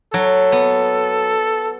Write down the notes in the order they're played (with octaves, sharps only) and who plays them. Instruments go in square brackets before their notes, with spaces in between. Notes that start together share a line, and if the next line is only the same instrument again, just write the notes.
[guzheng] F#3 [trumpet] A4
[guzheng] B3